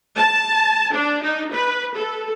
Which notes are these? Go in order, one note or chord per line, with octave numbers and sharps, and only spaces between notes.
A5
D4
D#4
B4
A4